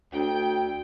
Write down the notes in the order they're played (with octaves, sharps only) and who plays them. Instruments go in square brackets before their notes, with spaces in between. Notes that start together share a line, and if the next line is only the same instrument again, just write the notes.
[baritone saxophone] D2 [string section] G5